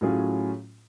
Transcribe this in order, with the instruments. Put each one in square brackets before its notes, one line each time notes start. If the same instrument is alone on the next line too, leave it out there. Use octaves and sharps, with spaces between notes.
[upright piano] A2 F#3 C#4 F4 G#4